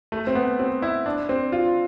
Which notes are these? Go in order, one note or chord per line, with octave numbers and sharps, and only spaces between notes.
A3
C4
B3
C4
E4
D4
C4
F4